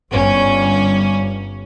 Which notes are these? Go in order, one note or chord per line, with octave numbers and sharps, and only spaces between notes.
G1 C#4